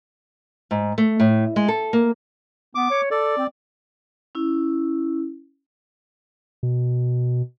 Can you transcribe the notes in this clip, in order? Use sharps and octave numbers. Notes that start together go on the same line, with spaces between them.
G#2
A3
A2
G#3
A4
A#3
B3 D6
C#5
A4 D5
C4
C#4 E4
B2